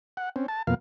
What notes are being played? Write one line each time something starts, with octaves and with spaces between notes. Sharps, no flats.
F#5
C4 C#4
A5
F2 B2 A#3 F5